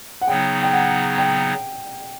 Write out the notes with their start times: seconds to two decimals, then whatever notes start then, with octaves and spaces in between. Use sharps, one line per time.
0.21 F#5
0.28 C#3 F#3 B3 D#4 G5
0.63 G5
0.73 F#5
1.18 G5